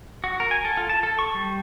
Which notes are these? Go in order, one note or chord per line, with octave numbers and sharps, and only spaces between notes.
F#4
A#4
G#5
A4
F4
A5
A4
C#6
G3